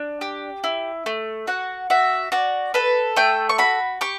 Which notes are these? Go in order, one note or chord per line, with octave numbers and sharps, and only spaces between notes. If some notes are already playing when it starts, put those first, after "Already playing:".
Already playing: D4
G4
E4
A3
F#4 F#5
F#4 E5
F#4 D5
A4 B4
A3 G5
C#6
F#4 B5
G4 C#6